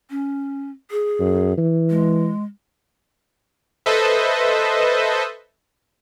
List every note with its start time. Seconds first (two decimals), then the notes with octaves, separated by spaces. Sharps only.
0.10 C#4
0.91 G#4
1.20 F#2
1.58 E3
1.90 G#3
3.86 A4 B4 C5 D#5 E5